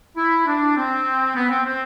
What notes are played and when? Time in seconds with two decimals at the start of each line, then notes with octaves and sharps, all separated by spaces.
0.16 E4
0.46 D4
0.75 C4
1.35 B3
1.49 C4
1.64 C4